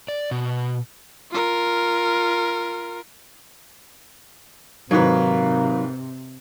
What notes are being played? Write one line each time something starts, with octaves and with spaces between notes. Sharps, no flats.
D5
B2
F4 A#4
G#2 C3 D#3 F#3 A#3 B4